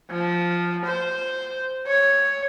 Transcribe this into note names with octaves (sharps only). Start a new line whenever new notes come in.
F3
C5
C#5